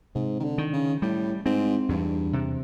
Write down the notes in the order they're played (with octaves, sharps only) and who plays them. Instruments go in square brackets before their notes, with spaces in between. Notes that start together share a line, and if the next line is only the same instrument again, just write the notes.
[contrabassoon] G#2 [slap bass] C3
[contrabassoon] D#3
D3
[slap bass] D#3
[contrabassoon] C#3
[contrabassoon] A2 [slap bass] G3
[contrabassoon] G#2 [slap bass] C4
[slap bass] E2 [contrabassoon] G2
[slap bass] C3